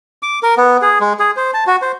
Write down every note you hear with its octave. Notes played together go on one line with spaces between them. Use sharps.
D6
A#4
B3
G#4
G#3
G#4
C5
A5
F#4
C5